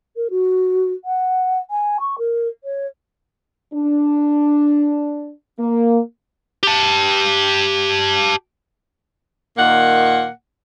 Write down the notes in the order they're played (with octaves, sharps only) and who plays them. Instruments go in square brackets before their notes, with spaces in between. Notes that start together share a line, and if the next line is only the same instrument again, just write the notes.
[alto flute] A#4
F#4
F#5
G#5
C#6
A#4
C#5
[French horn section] D4
A#3
[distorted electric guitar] G4 A5
[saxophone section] A#2 D#3 A#3 F#5